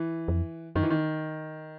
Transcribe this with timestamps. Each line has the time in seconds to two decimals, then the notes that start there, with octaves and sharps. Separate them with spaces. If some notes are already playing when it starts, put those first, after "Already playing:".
Already playing: E3
0.28 F2
0.76 F#2 D#3
0.83 E3
0.90 D#3